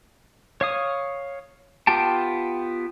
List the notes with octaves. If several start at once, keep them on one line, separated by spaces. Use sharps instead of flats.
C#5 F5 D#6
B3 F4 G4 G5 A5